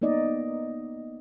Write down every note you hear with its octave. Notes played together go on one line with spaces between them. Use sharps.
A#3 B3 D#4 D5 D#5